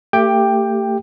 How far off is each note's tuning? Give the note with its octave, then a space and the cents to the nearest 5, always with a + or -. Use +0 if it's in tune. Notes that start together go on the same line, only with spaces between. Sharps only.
A3 +40 G4 +5 G5 +10